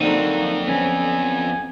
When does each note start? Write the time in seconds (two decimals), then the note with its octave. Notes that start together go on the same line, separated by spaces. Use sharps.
0.01 F2 D3 F3 F#3 A#3 C4 D#4
0.67 B3 C#4 G#5